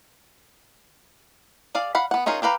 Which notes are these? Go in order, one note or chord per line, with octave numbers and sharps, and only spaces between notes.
G#4 D5 F5
F5 F#5 B5
B3 F#5
C#4 D#4 F4 G#4 A#4
D4 G4 B4 F5 A#5